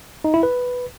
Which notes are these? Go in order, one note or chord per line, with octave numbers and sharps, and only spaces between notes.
D#4
E4
B4